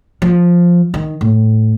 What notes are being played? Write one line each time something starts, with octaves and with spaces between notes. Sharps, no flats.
F3
D#3
A2